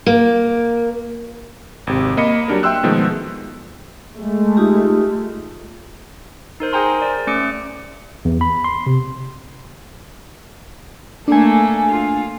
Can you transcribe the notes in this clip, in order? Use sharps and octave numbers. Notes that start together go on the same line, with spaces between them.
A#3
G#1 C3
A#3 D#5 B5 C#7
F#3 G3 D4 A#4
E5 G5 C6 E6 F#6
B2 D#3 F3 G#3 A3 B3
G#3 A3
D#4 F4 G4
D#4 A#4 C5
G#4 C5 G5 G#5 A#5 C6
A#4 D5
A3 C#4 D5 D6 C#7 D7
E2
B5
C6
C3
A3 A#3 D4 A4 G#5
F4